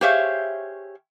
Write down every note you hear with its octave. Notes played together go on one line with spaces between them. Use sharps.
G4 G#4 C5 C#5 E5 F5